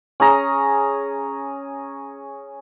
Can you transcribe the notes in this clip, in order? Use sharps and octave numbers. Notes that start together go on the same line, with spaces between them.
C#4 G#4 A#5